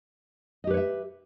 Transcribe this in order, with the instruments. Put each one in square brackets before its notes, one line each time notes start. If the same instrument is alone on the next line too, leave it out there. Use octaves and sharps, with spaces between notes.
[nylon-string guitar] D#5
G4
B4
C#5
E5